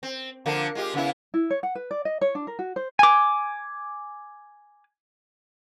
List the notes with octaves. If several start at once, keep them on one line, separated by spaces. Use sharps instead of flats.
C4
D3 F3 A#3
G#3 F4 G4
C#3 B3 E4
E4
C#5
F#5
B4
D5
D#5
C#5
D4
A#4
F#4
C5
G#5 D6